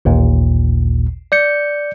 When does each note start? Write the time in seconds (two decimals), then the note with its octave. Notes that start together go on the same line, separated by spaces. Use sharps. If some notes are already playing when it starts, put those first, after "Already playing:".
0.05 A1 D#2 A#2
1.32 D5 G6 C#7